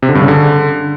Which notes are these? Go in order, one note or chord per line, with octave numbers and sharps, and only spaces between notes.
C3
D3
G2
C#3
D3